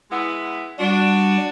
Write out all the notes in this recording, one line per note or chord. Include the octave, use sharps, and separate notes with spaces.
G#3 B3 E4
G3 D4 F#4